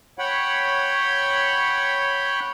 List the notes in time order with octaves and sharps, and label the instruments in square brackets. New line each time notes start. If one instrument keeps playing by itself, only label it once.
[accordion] C#5 F#5 G5 B5